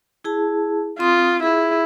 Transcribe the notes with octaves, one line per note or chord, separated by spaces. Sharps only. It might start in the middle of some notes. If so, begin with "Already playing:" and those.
E4 G#4 A5
C4 F4 C6 D#6
E4 G#4